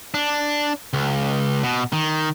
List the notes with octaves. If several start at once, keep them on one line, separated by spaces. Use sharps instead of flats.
D4
C#2
B2
D#3